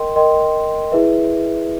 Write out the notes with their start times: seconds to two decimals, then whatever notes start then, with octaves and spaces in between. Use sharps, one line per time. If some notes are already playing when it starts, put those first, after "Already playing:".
Already playing: A#4 D#5 G5 C6
0.16 A#4 D#5 G5 C6
0.92 E4 G#4 B4 E5